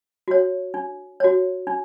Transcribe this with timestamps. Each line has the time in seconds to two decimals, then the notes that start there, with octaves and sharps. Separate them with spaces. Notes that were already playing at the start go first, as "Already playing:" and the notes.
0.28 F#4 C#5
0.74 D4
1.20 F#4 C#5
1.67 D4